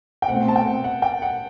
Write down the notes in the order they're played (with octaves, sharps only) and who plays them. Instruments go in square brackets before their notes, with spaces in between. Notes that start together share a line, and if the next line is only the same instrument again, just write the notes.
[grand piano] G5
[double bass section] B2 A3 C4 [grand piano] F#5
[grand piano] A5
G5
F#5
G5
F#5